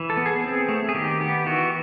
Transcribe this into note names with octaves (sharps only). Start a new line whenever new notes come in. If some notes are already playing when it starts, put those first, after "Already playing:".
Already playing: E3
A4
B3
G#4
C4
A3
G#4
D#3 G4
B3 G4
E3 F#4